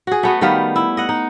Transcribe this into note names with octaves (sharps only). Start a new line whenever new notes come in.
F#4 G#4
A3 B3 F#4
D#3 G3 B3 F5
E4
D#5 F#5
D#4